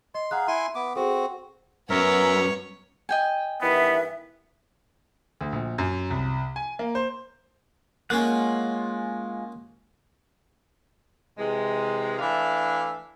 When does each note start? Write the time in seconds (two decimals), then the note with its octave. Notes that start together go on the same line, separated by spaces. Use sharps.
0.15 D#5 C6
0.31 G#4 F5 F#5 A#5 F#6
0.48 E4 E5 G#5 C6
0.75 B3 D6
0.96 C4 F#4 G#4 A4
1.90 F#2 B3 A#4 C#5 E5
3.09 D#5 G5 G#5
3.61 G2 D#3 E3 B3 E5
5.41 D2
5.52 A#1
5.78 F#2
6.10 C2
6.56 G#5
6.79 A#3
6.95 C5
8.10 G#3 A#3 C#4 F4 F#5
11.39 C3 E3 G#3
12.19 E3 A3 D4 E5 F5